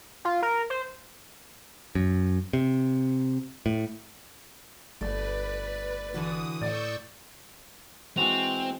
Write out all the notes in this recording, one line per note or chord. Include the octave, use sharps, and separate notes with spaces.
F4
A#4
C5
F#2
C3
A2
G1 A3 B4 D5
D3 E3 F#4 D#6
A2 D5 C#6 E6 G6
E3 G#3 C4 F#4 F7